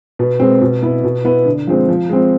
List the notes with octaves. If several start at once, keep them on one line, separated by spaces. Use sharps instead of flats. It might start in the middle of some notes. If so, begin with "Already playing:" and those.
B2
G#3 C4
B2
B3 E4
B2
B3 E4
D3
F3 G#3 C4
F3
G#3 C4